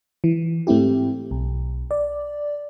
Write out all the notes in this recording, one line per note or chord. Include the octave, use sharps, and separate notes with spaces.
E3
G#2 A3 C4 E4 G4
B1
D5